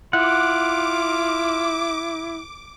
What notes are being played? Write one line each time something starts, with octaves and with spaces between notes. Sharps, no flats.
E4 F4 F#5 D6